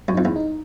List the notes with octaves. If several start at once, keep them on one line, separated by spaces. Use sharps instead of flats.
F#2
F2 D#4
E2
D#4